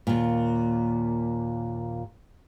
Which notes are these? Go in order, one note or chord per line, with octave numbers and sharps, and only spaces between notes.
D#2 A#2